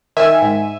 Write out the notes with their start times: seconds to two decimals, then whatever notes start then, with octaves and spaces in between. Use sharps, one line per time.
0.17 D#3 E5 G#5
0.42 G#2